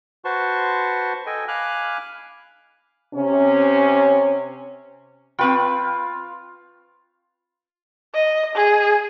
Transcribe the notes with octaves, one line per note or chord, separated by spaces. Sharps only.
F#4 B4 C5 A5 C6 C#6
A4 D#5 G5 G#5
F5 G#5 B5 D6 F6 F#6
C3 C#4
C4 F4 B4 G5 B5 C#6
D#5
G#4